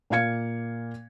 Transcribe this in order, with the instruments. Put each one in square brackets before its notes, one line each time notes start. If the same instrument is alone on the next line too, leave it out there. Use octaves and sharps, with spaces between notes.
[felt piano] A#2 A#3 F5 G#6 C#7